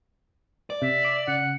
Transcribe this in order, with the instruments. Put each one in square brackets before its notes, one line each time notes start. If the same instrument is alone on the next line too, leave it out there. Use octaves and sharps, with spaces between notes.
[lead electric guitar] D5
[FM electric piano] C3 [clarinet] E5
[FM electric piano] D6
[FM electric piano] C#3 [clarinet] F#5